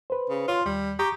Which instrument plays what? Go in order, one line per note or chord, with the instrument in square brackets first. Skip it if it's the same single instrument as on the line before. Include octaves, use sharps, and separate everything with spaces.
[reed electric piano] B4 C5
[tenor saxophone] C#3
[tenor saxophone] F4 [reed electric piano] C#5 C6
[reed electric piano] D#2 [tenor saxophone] G3
[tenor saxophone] G4 [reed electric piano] A#5 C#6 D#6